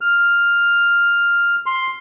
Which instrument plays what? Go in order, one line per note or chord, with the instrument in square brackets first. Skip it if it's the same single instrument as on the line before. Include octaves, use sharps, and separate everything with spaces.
[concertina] F6
C6